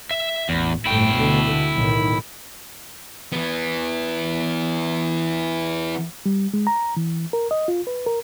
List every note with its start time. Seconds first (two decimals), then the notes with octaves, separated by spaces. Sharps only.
0.11 E5
0.49 A1 E2
0.86 G1 A2 A3 E4 G5
1.14 D2 B2 D3
1.74 B1 A2 D#3
3.32 E3 B3
6.26 G3
6.54 G#3
6.67 A#5
6.97 E3
7.33 A#4
7.51 D#5
7.68 F4
7.87 B4
8.07 A#4